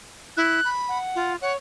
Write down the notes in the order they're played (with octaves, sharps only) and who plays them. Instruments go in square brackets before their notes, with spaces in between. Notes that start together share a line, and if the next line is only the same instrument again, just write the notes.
[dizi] E4 [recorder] F#6
[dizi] B5
[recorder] F#5
[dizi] F4
[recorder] C#5 [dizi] F#5